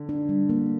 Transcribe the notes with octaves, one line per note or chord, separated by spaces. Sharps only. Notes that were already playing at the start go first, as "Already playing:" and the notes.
Already playing: D3
D4
G3
A#3